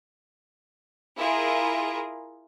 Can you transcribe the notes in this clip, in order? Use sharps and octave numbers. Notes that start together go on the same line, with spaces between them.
E4 F4 G#4 A#4